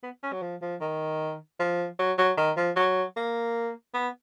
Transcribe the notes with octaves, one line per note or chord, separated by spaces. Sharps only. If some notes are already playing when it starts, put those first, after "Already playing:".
B3
C#4
F#3
F3
F3
D#3
F3
F#3
F#3
D#3
F3
F#3
A#3
B3